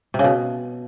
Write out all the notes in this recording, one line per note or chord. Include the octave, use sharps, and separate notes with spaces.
C3
C#3
B2